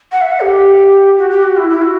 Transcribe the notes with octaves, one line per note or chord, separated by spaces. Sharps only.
F#5
E5
F#5
G4
F#4
G4
F#4
E4
E4
F#4